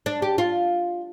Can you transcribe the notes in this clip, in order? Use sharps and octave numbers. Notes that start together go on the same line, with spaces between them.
D4
G4
F4